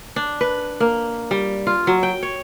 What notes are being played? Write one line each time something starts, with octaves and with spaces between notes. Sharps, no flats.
D4
B4
A#3
G3
F4
F#3
G5
C#5